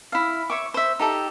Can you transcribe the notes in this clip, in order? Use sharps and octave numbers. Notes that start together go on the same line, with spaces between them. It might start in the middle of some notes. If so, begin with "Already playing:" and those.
E4 F5
C#5 E5 C#6 D6
C5 E5
D#4 G4 A4